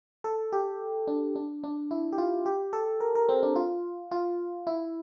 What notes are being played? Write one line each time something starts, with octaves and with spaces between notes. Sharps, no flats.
A4
G4
D4
D4
D4
E4
G4
F4
G4
A4
A#4
A#4
C4
D4
F4
F4
E4